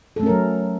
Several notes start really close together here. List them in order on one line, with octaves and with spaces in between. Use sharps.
A4 A3 C#4 A#4 F#3